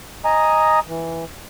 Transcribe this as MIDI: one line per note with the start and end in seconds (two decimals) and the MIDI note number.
0.25 0.79 75
0.25 0.79 80
0.25 0.79 82
0.25 0.79 87
0.88 1.25 52